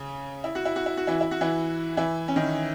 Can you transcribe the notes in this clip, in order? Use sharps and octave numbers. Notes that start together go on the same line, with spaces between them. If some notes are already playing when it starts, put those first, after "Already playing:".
Already playing: C#3 C#4
E4
F#4
E4
F#4
E4
F#4
E3 E4
E4
F#4
E3 E4
E3 E4
C#4
D#3 D#4